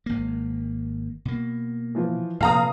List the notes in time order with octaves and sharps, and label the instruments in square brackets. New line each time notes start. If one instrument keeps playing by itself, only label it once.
[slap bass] G#1 A#3
B2 A#3
[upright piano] E3 F3 F4
[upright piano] F1 [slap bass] A#2 F3 [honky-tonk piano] F5 A#5 D#6